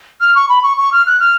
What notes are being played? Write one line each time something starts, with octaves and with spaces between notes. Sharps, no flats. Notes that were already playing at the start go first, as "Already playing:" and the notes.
F6
C#6
B5
C#6
C#6
F6
F#6
F6